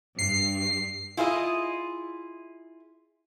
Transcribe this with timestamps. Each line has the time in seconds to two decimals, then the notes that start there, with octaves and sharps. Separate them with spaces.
0.19 G2 C7
1.17 E4 F4 G#4 A#4 D#5